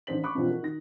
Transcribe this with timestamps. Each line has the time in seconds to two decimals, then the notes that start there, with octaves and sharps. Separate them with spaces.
0.07 A1 D#3 D4 C5 B6 F#7
0.24 B5 C#6 D6 F#6
0.35 G2 B2 E3 F3 C4 F4
0.48 F#4 A#4
0.62 D#3 A#6